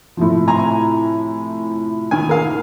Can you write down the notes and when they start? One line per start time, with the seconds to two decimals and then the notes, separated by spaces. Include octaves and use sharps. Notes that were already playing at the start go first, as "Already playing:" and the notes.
0.17 A2 C3 F3
0.48 G#5 A#5 C6
2.11 D#3 G#5
2.29 A#4 F5